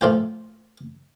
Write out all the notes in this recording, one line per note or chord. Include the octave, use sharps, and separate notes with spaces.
A2 F3 F4 G5